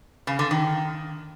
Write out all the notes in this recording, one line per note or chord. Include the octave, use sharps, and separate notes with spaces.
C#3
D3
D#3